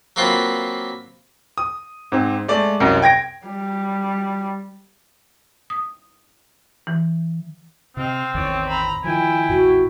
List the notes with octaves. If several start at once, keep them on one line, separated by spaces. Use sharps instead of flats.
F#3 A#3 C4 F4 B4
D#6
G#2 C4
G#3 A3 D5
C2 F#2 D#5
G5 G#6 A#6 D7
G3
D#6
E3
C3 C4 D#5 F5
A1 E2 D#3 C#5 D5
A#5 B5
D#3 F3 E4 G5 G#5
A#1 E2 A2 F#4